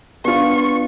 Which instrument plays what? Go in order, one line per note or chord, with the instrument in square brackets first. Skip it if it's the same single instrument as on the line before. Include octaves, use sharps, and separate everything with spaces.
[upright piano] B3 D4 F4 [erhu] C#6